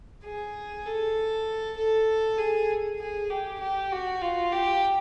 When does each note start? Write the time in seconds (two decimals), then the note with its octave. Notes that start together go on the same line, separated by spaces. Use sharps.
0.24 G#4
0.86 A4
1.77 A4
2.38 G#4
2.99 G#4
3.30 G4
3.60 G4
3.92 F#4
4.22 F4
4.52 G4